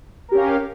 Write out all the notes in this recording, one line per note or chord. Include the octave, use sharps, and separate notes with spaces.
C#4 G4 A#4 F5